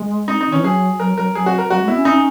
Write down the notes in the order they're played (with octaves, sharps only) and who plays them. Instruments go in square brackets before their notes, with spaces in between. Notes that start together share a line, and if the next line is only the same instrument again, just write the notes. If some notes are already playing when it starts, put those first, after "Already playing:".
Already playing: [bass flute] G#3
[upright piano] D#4
D#4
[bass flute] D#3
[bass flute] E3 [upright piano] C#4
[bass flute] F#3 [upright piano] G#4
[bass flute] F#3 [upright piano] A#4
[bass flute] F#3 [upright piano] A#4
[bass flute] F#3 [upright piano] G#4
[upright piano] F#4
A#4
[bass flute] F#3 [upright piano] F#4
[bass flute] G#3
[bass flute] B3 [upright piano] E4
[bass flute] C#4
[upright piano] D#4